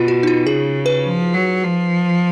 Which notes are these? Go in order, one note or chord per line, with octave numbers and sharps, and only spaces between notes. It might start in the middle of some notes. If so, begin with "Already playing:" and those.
Already playing: B2 F4
F#4
D#4
F4
C#3 G#4
B4
F3
F#3
F3